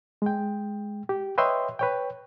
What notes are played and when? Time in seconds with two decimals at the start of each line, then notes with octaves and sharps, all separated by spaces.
0.22 G#3 G5
1.09 G4
1.38 B4 C#5 D#5 E5 G5 C6
1.79 B4 C#5 G5